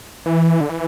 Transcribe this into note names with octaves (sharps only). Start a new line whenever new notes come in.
E3
D3
E3